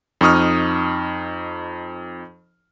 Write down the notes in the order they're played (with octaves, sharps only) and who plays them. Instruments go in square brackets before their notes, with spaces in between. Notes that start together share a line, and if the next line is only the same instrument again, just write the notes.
[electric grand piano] F2 D#4 C#6 D#6 F6